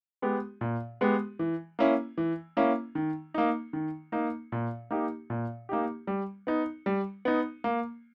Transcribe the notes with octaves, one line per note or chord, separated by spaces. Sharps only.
G#3 B3 G4
A#2
G#3 B3 G4
E3
A#3 C#4 E4
E3
A#3 C#4 E4
D#3
A#3 D#4
D#3
A#3 D#4
A#2
A#3 D#4 G4
A#2
A#3 D#4 G4
G3
B3 D#4
G3
B3 D#4
A#3